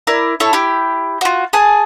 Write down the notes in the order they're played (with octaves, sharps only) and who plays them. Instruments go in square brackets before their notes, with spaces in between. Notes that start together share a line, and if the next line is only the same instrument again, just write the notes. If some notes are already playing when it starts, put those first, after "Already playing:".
[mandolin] E4 A#4 D5
E4 A4 C#5
E4 G4
F4 F#4
G#4 G#5 A5